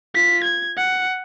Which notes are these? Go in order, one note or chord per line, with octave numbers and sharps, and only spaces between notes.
F4 B6
G#6
F#5